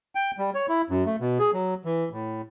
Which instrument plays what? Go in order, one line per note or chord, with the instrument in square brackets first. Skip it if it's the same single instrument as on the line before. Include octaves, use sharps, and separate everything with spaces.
[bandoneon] G5
G3
C#5
E4
F#2
A3
B2
G#4
F#3
E3
A2